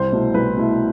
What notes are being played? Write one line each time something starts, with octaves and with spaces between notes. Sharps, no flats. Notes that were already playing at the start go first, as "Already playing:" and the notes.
Already playing: C2 C5
B2 A3 E4
C2 B4
B2 A3 E4